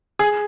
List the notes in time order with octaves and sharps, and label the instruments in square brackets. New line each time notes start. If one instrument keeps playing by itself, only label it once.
[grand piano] G#4